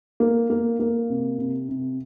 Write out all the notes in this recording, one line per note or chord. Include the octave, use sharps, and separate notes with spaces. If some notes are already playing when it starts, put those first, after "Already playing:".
A#3
A#3
A#3
C3
C3
C3